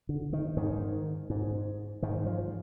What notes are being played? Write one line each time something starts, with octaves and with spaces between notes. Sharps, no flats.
D3
D#3
G#2 D#3
G#2
G#2 D#3
F3